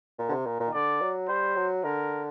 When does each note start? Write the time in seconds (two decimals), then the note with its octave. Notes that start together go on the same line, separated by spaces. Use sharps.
0.18 A#2
0.29 D3
0.32 C3
0.46 A#2
0.60 A#2
0.67 D#3
0.74 D3 D5
1.01 F#3
1.29 G3 C5
1.56 F#3
1.84 D3 A#4